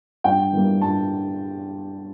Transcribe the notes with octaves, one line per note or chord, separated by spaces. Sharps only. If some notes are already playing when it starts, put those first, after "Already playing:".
G2 G5
E3 G3 A#3
G2 A5